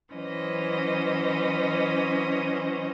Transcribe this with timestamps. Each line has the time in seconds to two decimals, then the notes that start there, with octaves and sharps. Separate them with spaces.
0.13 E3 F#3 C#4 C5 D#5